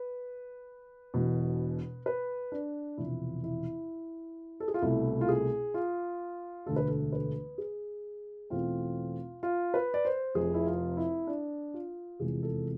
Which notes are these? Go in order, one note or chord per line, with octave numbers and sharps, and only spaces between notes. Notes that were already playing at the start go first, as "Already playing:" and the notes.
Already playing: B4
E1 E2 B2
B4
D4
E1 E2 C3 F3 E4
E4
A4
G#4
F4
C2 B2 A3 E4
F4
G#4
F4
E1 D2 D3 A3 A4
B4
A4
B4
G#4
E2 B2 A3 C4 F4
F4
B4
D5
C5
F1 F2 C3 G#4
E4
F4
E4
D4
F4
F1 E2 C3 F3 G#3 G#4
A4